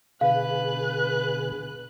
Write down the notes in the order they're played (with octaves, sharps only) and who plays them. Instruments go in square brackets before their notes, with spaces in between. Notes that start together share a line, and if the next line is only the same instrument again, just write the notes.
[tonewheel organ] B2 D3 G#4 [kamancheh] B4 F#6 [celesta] F5